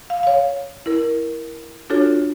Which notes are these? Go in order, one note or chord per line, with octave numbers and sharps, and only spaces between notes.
F5
C#5 F5
E4 A#4
D4 F4 F#4 A4 C#5